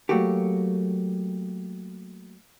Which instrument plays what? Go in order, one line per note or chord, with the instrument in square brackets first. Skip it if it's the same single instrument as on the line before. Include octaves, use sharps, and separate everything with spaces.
[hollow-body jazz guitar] F#3 A3 A#3 F#4 G4